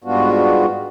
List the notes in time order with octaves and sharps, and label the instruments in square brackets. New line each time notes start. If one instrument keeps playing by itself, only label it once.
[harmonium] G#2 G3 B3 D4 F4 F#4